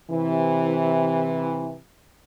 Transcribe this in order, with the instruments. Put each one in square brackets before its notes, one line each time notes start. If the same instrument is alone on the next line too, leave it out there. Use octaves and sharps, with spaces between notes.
[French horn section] C3 E3